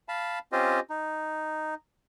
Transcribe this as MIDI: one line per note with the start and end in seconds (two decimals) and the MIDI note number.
0.08 0.39 77
0.08 0.39 81
0.08 0.39 83
0.52 0.80 60
0.52 0.80 61
0.52 0.80 65
0.52 0.80 67
0.52 0.80 72
0.52 0.80 75
0.90 1.74 63